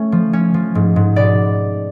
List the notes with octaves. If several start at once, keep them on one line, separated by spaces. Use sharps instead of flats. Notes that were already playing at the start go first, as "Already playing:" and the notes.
Already playing: A3 C#4
F3
C#4
F3
G#2
G#2
B2 D5